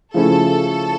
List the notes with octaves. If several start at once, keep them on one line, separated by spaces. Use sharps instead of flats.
C#3 F3 A3 C#4 E4 A4